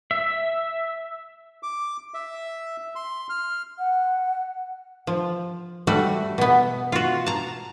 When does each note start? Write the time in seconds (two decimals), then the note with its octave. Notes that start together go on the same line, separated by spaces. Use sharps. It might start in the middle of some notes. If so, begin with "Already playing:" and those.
0.11 E5
1.63 D6
2.14 E5
2.95 C6
3.30 F6
3.79 F#5
5.07 F3
5.87 G3 A3 F#4
6.38 B2 B3
6.92 F4 F#4
7.26 A5 A#5